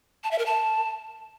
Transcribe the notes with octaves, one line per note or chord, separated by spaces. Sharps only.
A5
E5
A#4
A5